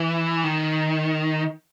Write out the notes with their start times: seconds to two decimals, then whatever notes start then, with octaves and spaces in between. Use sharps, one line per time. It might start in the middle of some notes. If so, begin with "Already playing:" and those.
Already playing: E3
0.44 D#3